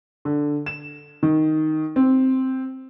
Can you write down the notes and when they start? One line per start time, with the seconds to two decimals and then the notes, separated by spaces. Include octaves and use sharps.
0.25 D3
0.66 E7
1.23 D#3
1.96 C4